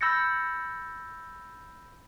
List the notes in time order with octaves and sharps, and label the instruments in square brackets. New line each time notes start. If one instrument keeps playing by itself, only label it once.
[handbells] B5 E6 G6 A6 A#6 C#7